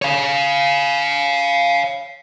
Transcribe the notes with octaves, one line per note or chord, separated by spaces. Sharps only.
C#5 F5